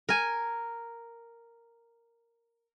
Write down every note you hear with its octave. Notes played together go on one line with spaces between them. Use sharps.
A#4 G#5